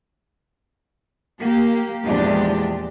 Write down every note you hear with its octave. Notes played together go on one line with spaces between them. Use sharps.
A#3 G4
E2 A#2 F3 G#3 D4 G4